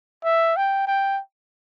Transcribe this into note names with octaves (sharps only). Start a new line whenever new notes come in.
E5
G5
G5